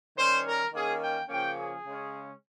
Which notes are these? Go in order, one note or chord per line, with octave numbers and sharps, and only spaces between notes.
D#3 G3 C#4 C5
A#4
D#3 A#3 C#4 G#4
G5
C#3 F3 A#3 C#4 G5
G#4
C#3 G#3 C#4